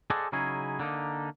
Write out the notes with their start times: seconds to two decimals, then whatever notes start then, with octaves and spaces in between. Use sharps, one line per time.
0.10 G#4 A4 C5 D5 D#5 F#5
0.32 C#3 F#3 C#4 D#4 E4 G#4
0.80 D3 A#3 D#4